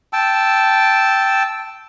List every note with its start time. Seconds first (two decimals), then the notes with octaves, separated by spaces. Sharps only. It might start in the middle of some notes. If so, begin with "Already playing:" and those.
0.13 G5 A5 E6